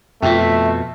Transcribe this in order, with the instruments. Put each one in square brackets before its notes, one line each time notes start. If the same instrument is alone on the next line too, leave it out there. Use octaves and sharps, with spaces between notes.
[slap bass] F2 B2 [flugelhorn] A3 [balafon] F4 G5 [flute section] E5